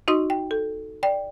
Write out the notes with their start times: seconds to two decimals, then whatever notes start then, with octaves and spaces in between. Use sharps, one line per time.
0.08 D#4 F#4 D#5 C6 D#6
0.30 G5
0.51 A4
1.03 D5 G5